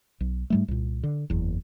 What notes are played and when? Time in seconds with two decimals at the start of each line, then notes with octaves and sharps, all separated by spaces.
0.20 B1
0.50 G#2 G3 A3
0.68 C2 A#2
1.03 D3
1.30 F#1 E2